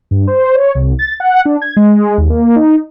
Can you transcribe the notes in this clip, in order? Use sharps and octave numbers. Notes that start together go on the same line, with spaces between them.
G2
C5
C#5
C2
A6
F#5
D4
G#6
G#3
D#2
A#3
D#4